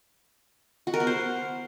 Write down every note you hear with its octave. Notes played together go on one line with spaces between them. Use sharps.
F#4
A#4
B3
C5